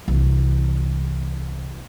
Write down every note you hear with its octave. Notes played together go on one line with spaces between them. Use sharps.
C2 E3